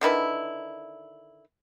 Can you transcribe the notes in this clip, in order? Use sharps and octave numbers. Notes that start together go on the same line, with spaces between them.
D3 D#3 E4 B4